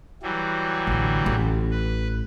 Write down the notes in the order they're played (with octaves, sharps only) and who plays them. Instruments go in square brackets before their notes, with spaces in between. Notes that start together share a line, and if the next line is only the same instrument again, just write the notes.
[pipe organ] E3 F#3 G3
[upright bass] A1 D3
A1
[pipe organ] B4